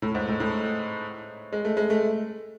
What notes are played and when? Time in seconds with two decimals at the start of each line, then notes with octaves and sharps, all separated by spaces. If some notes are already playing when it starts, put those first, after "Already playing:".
0.02 A2
0.15 G#2
0.28 A2
0.40 A2
1.52 G#3
1.65 A3
1.77 G#3
1.90 A3